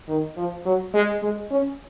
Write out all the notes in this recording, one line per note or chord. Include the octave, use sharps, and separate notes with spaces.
D#3
F3
F#3
G#3
G#3
C#4